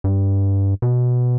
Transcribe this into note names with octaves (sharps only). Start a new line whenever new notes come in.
G2
B2